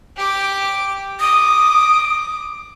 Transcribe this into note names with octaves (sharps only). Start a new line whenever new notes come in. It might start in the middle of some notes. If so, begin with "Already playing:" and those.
G4 D6
D6 D#6